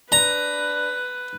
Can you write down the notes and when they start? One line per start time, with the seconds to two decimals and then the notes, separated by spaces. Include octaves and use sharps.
0.12 D4 B4 A#5